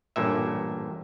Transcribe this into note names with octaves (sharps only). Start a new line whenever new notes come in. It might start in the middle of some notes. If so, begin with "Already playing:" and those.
A1 G2 A#2 E5